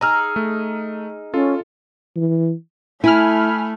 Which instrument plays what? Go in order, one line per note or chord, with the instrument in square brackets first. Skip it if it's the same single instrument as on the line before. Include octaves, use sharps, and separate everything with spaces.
[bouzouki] D#4 G#4 [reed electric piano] A#5 E6 F6
[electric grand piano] A3
[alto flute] C#4 [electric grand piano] F4 A4
[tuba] E3
[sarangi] A3 [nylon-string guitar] E4 [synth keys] G#5 B5 F6